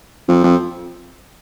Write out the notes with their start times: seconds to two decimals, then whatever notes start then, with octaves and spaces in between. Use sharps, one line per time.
0.28 F2
0.44 F2